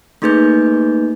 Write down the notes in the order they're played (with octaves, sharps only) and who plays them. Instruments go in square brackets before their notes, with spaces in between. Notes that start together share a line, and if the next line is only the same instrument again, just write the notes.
[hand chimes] A3 A#3 D#4 G#4 B4 G6